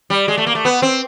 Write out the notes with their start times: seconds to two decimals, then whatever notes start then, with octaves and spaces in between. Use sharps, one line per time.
0.10 G3
0.28 G#3
0.37 A3
0.47 A#3
0.55 A3
0.65 B3
0.82 C4